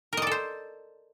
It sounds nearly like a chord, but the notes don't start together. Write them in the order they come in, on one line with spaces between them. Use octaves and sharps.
A#4 D#5 D5 A4 C5